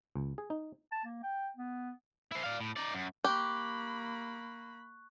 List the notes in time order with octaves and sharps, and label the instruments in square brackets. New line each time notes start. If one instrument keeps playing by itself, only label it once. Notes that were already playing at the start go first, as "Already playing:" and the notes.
[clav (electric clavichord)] C#2
G#4
D#4
[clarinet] A5
A#3
G5
B3
[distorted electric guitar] E4 C5
D5 F5
A2
D#4 D5
F#2
[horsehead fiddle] A#3 B5 [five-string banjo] G4 [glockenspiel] C#6 F#6